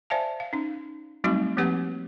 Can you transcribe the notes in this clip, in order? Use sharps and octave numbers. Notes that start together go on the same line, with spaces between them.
C5 D5 E5 F5 G#5 A5
F5
C#4 D#4
F#3 G3 A3 C4 D#4 F#4
F3 A#3 C4 G4 B4 F#5